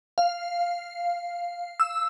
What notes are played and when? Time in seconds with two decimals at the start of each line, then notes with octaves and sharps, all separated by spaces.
0.18 F5
1.80 E6